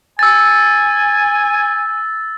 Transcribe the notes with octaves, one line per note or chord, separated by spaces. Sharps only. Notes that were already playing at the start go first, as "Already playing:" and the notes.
G#5 E6 A6